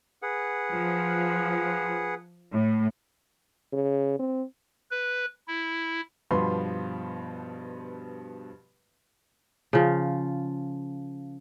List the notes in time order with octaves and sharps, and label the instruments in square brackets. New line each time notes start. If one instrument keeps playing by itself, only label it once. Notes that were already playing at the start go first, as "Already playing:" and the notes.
[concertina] G#4 B4 F#5
[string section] F3
A2
[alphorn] C#3
C4
[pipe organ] B4
E4
[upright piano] G2 B2 F3 B3 B5 C6
[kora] C#3 F3